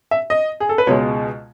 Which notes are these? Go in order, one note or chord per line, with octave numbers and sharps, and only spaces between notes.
E5
D#5
G#4
A4
B4
C#2 B2 G#3 C#5